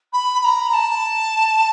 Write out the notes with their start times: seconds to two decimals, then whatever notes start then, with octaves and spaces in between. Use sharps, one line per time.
0.13 B5
0.40 B5
0.44 A#5
0.69 A#5
0.73 A5